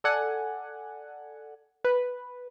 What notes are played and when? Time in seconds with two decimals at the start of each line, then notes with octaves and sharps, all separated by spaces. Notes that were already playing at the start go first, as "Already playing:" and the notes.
0.04 A4 D5 F#5 G#5
1.84 B4